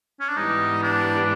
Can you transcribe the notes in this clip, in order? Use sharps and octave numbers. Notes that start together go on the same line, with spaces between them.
C#4
D4
G#2 E3 G3 B3 D#4
D4